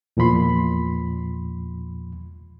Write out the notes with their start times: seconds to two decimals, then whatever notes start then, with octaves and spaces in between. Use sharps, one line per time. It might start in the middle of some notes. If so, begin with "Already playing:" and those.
0.17 E2 A#2 F3 B5 C6